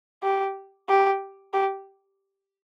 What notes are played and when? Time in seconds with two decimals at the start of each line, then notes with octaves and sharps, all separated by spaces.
0.23 G4
0.89 G4
1.54 G4